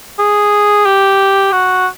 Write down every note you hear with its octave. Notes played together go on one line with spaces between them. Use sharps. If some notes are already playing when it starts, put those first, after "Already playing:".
G#4
G4
F#4